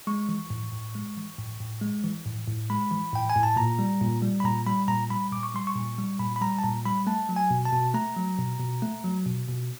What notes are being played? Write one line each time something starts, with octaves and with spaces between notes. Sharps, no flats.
G#3 C#6
E3
A2
A2
G#3
E3
A2
A2
G#3
E3
A2
A2
G#3 B5
E3
A2 G5
G#5
A2
A5
A#2 A#5
G3
A#2
G3
B5
A#2 A#5
G3 B5
A#2 A#5
G3 B5
A#2 D6
C#6
G3 C6
C#6
A#2
G3
A#2 B5
B5
G3 A#5
A5
A#2 A#5
G3 B5
A3 A5
F#3
G#5
B2
A5
B2
A3 A#5
F#3
B2
B2
A3
F#3
B2
B2